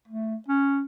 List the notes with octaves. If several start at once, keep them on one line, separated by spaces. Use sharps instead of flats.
A3
C#4